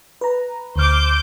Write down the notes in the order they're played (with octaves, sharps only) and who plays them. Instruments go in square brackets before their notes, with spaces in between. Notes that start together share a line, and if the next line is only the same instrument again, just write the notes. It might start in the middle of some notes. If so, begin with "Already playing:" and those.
[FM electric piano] B4 A#5
[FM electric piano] D2 F6 [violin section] C5 D6 G6